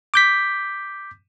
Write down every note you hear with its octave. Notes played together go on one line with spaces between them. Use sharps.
D6 G6 B6